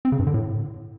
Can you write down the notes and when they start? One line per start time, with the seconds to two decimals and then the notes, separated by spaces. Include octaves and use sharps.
0.05 C4
0.12 C#3
0.19 G2
0.27 D3
0.34 A2